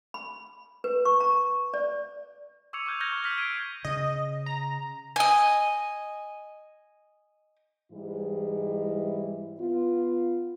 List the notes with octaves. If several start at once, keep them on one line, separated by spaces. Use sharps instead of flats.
B5
B4
C#6
A#5
D5
C#6 D6 E6 G#6 C#7 F7
C#6 D6 F6 G6 G#6 F7
F6 G6 G#6 A#6 F7 G7
C#6
F6 B6 F#7
E6 G#6 C7 D7 D#7
C#3 D#5
A#5
D#5 G#5
G#2 E3 G3 G#3 E4
B3 F4